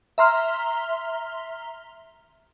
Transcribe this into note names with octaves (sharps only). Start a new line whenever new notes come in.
E5 A#5 C6 F6